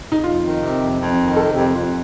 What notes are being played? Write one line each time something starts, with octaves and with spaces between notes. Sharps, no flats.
D#4
F2 F4
D#3
C3
F2
F2
D#3
C3 A4
F2 G4
F2 F4